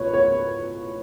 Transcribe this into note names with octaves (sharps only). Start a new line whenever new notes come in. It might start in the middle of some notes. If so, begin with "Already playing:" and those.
Already playing: C#2 B2 B4 C#5
C#5